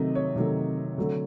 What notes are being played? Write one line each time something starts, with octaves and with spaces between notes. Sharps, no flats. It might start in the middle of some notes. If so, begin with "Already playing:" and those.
Already playing: C3 D#3 F#3 A3 D#5
C#5
C3 D#3 F#3 A3
D3 F#3 A3